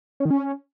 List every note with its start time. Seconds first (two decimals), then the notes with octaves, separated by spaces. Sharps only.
0.20 C#4
0.25 D#3
0.31 C#4